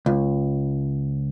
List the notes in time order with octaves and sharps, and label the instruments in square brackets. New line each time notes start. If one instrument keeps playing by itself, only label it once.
[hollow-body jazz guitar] C#2